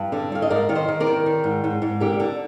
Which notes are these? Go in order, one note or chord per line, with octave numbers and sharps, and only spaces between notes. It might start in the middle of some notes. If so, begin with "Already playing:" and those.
Already playing: G2
D3
G2 F5
D#5
G#2 A#4 D5
D#3 F5
C5 D#5
D#3
A#4 D5
D#3
D#3
G#2
G#2
G#2
D3 G4 A#4
D3